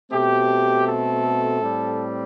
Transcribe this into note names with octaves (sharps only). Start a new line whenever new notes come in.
B2 A3 C4 G4
A4
A2 G3 C4